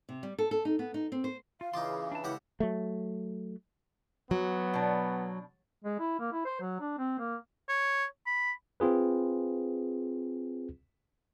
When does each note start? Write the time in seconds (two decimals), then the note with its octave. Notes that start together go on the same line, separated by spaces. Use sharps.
0.09 C3
0.23 G3
0.38 A4
0.51 A4
0.65 D#4
0.79 B3
0.94 D#4
1.12 C4
1.24 C5
1.61 F4 F5
1.74 C#3 E3 D#4 F4 C6 D6
2.12 D4 A5
2.24 C#2 E4 F#4 G4 A4 F#5
2.60 F#3 A3
4.31 F#3 B3
4.74 B2 D4
5.84 G#3
5.99 E4
6.19 A#3
6.32 E4
6.45 C5
6.61 F#3
6.80 D4
6.98 C4
7.19 A#3
7.69 C#5
8.27 B5
8.80 C4 F4 G#4 B4